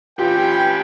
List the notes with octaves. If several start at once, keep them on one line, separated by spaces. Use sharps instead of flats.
C#4 F4 G4 B4 G5